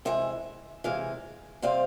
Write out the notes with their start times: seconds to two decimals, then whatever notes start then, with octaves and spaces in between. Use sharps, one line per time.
0.05 C3 E3 G#3 E5
0.84 C3 E3 G#3 F5
1.62 C3 G3 C4 F5